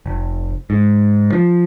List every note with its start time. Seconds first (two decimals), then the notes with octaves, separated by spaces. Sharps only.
0.06 F1
0.70 G#2
1.32 F3